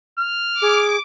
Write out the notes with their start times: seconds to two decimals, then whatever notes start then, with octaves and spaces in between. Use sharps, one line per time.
0.20 F6
0.62 G#4 D6